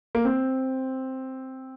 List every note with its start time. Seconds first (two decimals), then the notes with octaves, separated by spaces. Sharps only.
0.15 A#3
0.25 C4